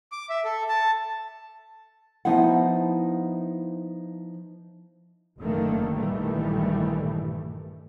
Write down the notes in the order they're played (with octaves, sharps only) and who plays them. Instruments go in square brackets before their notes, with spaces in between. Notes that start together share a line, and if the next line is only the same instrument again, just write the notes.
[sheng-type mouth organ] D6
E5
A4
A5
[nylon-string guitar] F3 B3 D#4 E4 F#5
[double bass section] F#1 D3 D#3 A3 A#3
A#1 G2 D#3 E3 G3 A3